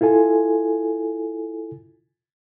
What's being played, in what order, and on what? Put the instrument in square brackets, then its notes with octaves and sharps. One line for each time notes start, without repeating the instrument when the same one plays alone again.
[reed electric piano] E4 F4 A4 G#5